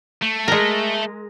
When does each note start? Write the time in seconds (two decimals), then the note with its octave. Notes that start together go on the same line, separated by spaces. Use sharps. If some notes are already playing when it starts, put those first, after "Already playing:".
0.22 A3
0.48 G#3 A#4